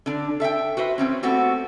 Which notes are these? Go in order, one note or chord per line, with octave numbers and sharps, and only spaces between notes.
D3 D4
A4 E5 F#5 G5
F#4 B4 C5 E5
E3 F3 C4 C#4
A3 B3 C4 F#4 G4 A4